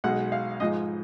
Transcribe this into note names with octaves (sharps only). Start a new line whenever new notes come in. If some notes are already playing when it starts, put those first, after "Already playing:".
B1 B2 G#3 F#5
F5
G#2 F3 G#3 D#5